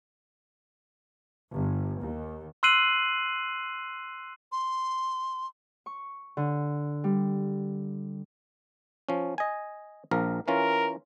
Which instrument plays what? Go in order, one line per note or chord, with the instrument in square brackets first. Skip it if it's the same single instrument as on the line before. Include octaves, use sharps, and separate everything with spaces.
[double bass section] G1
D#2
[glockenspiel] C6 E6 F#6 C7 D#7 F#7
[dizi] C6
[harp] C#6
D3
G3
[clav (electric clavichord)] F3 C#4
D#5 G#5
A#1 F3 A#4
[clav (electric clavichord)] E3 C#4 F4 [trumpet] A#4